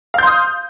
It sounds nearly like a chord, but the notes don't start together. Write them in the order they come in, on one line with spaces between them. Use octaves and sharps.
F5 G6 C6 D#6